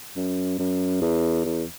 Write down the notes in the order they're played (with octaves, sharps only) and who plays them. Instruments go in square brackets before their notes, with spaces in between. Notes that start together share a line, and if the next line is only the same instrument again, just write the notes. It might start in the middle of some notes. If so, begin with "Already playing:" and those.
[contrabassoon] F#2
F#2
E2
E2